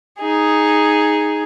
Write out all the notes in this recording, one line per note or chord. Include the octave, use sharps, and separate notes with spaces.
D#4 G#4